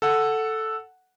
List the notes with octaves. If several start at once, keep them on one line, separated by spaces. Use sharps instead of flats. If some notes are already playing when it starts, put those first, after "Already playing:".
A4 F#5